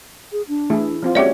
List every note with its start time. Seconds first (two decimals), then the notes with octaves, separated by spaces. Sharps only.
0.32 G#4
0.48 D4
0.70 E3 A3 E4 G#4
1.03 F3 C4 F4
1.15 G#3 A#3 C#4 F#4 G4 C#5 D5 E5